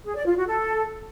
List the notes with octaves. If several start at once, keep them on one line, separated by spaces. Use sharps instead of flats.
G#4
D5
F4
F#4
A4